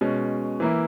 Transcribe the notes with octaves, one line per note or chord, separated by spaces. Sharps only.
B2 G#3 C#4
E3 A#3 E4